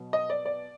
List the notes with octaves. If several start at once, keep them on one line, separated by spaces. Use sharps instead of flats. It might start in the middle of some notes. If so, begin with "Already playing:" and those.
Already playing: B2 F#3 B3
D#5
D5
D5